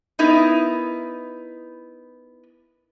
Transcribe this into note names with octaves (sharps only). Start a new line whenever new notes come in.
B3 D#4 E4 A#4